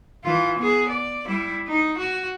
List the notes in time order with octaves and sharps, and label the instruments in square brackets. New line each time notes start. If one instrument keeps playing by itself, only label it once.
[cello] E3 F4
B3 G#4
D5
G3 E4
D#4
F#4